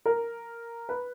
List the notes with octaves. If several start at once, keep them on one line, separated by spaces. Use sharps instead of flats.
A#4
B4